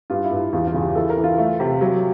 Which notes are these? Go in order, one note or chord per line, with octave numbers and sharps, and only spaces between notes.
G2 F4
E4
G2
E4
E2 F4
F4
C#3
G4
E3 A4
A#4
E3
F4
A3
C3
F#3